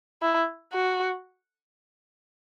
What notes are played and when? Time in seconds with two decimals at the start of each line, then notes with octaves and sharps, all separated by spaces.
0.22 E4
0.73 F#4